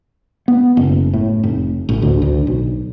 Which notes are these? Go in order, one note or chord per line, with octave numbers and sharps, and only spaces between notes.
B3
F#1
A2
F1
A1
D2
D2
B1